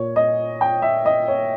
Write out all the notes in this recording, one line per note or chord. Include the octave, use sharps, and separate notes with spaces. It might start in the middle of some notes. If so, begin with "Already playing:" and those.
Already playing: A#2 A#3 C#5
D#5
G5
E5
D#5
C#5